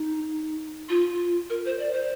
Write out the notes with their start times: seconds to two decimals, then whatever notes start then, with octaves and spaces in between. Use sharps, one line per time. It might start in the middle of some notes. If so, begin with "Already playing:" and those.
Already playing: D#4
0.88 F4
1.49 A#4
1.64 C5
1.78 D5
1.91 C5